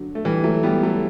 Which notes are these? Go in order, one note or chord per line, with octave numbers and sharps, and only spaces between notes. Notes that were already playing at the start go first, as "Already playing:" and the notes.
Already playing: D3 F#3
A3
E3 G3
F#3 A3
G3 B3
F#3 A3